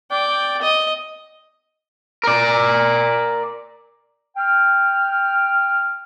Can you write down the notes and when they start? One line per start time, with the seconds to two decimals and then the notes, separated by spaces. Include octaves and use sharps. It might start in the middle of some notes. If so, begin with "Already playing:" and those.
0.11 D5 G5
0.62 D#5
2.24 A#4 D5
4.37 G5 F6